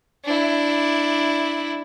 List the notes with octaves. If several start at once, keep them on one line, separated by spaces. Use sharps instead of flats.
D4 E4